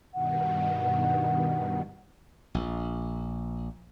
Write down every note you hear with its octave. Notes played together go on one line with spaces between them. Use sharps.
G2 B2 D#3 F#5
A#1